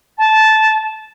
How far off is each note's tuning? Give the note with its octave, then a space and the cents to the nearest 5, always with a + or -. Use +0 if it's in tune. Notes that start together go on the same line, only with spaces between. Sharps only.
A5 -10